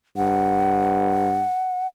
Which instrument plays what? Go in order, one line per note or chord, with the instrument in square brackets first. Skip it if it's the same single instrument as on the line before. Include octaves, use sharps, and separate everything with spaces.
[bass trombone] G2 [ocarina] F#5